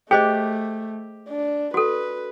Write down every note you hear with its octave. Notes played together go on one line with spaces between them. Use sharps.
A3 G4 G#4 C5 D#5
D4
F#4 A4 B4